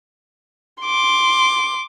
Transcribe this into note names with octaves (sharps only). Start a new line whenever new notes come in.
C6 D6